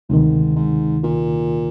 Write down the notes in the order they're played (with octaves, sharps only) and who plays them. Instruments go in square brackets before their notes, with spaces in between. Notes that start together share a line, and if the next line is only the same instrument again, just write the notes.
[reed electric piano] D2 C3 D#3 [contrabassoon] G#2
[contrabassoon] G#2
A#2